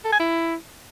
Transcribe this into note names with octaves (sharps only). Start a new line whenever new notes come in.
A4
G#5
E4